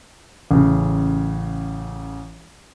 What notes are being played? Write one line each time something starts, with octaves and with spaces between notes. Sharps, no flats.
A1 C#3